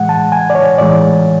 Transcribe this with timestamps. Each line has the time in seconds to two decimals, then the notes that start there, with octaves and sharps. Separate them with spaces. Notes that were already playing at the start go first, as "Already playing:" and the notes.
Already playing: A2 E3 G#3 F#5
0.09 A5
0.32 G#5
0.50 D5
0.55 C#5
0.78 A2 E3 G#3 D5